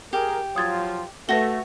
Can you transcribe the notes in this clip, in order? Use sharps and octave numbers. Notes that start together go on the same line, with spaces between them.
G4 G#4 A#4
F3 F#3 F4 D#6 G#6 A6
A3 F#4 B4 C#5 A#6 G7